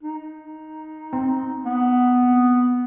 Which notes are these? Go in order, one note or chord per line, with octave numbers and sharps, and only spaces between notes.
D#4
C4
B3